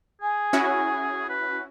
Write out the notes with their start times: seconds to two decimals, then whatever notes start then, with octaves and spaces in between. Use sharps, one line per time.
0.22 G#4 G#5
0.53 C#4 E4 F#4
1.29 B4